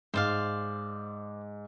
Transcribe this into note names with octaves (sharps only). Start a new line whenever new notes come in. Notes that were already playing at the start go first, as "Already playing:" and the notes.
G#2 C5 D5 F5